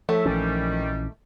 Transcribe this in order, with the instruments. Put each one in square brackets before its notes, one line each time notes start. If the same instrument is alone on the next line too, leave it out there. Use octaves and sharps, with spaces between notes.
[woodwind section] A2 E5 [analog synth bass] F3 [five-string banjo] A3
[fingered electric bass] A#1 E3 C#4 [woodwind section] D#3 G3